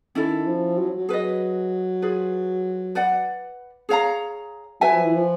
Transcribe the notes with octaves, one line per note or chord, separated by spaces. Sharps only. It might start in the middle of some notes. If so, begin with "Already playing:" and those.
D#3 C#4 E4 A4
F3
F#3
F#3
G#4 B4 D#5
F4 G#4 B4
B4 D5 F#5
G#4 C#5 F5 A#5
F#3 B4 E5 G#5
F3
E3
F3